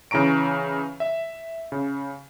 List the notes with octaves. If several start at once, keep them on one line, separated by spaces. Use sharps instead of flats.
C#3 E3 A#5 C#6 D7
E5
C#3